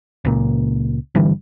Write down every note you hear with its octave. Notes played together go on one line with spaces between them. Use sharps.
C#2 A#2
G1 D3 E3 G3